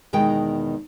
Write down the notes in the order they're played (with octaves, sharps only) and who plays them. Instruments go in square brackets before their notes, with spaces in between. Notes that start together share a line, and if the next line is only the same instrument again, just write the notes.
[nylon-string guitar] E2 B2 D#3 G#3 G5